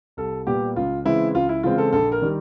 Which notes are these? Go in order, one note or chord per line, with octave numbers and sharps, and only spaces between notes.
C2 A4
A#2 G3 B3 G4
C#2 F4
C#3 E3 G#3 C4 E4
C#2 F4
E4
C#3 E3 G#3 C4 F4
A4
A#1 A4
A#4
D#3 G3